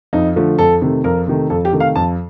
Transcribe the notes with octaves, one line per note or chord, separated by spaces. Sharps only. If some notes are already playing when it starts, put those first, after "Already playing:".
F2 D#4
D3 F3 A3
F2 A4
C3 D#3 A3
F2 A#4
C3 D#3 A3
F2 A4
G4
C3 D#3 A3
F5
F2 A5